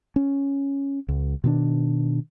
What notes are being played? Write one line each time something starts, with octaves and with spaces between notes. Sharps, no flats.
C#4
C#2
B2 D#3 C#4 D4